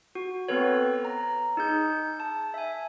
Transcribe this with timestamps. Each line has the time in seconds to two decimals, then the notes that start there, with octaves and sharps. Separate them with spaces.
0.15 F#4
0.48 B3 C4 A4 B4 C#5
1.05 A#5
1.57 D#4 G#4 G6
2.20 A5
2.54 E5 G#5